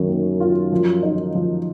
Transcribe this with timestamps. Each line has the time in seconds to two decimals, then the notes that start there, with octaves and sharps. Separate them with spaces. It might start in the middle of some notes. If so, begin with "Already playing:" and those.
Already playing: F#2 D#3
0.09 A#3
0.40 F4
0.72 F3
1.03 D#4
1.35 F3